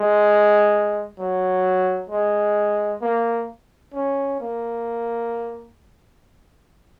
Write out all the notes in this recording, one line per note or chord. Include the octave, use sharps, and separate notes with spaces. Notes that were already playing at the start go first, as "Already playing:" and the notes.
Already playing: G#3
F#3
G#3
A#3
C#4
A#3